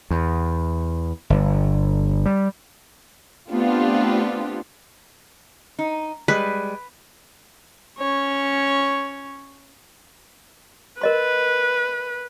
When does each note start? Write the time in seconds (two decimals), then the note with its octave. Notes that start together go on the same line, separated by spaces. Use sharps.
0.11 E2
1.30 G1
2.26 G3
3.50 A3 B3 C4 D4 F4 G4
5.79 D#4
6.28 G3 G#3 B4
7.98 C#4 C#5
11.01 A#4 B4 D#5 C6